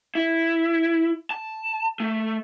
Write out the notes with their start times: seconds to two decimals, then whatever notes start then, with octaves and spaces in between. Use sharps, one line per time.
0.15 E4
1.31 A5
2.00 A3